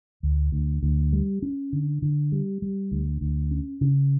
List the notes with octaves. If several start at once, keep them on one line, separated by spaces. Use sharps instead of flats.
D2
D2
D2
G3
C#4
D3
D3
G3
G3
D2
D2
C#4
C#3